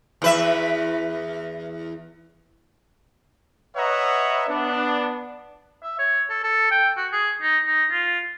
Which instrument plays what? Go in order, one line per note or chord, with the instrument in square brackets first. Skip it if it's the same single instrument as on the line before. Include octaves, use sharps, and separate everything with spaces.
[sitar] E2 B4 E5
[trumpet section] B4 C#5 D#5 E5 F#5 A#5
B3 D4
[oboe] E5
C#5
A4
A4
G5
F#4
G#4
D#4
D#4
F4